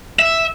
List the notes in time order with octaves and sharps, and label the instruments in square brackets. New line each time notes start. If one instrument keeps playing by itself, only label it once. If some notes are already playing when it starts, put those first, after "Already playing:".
[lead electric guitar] E5